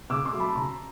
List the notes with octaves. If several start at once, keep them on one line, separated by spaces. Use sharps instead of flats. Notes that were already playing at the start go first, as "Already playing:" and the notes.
C#3 D6 E6
C6 D6
F#3 A3
A5 B5
C#3 A#5 C6